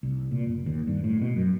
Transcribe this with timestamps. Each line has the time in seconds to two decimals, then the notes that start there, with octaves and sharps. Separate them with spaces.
0.03 C2
0.31 A#2
0.47 F#1
0.66 D#2
0.87 G2
1.04 A2
1.22 B2
1.36 F#2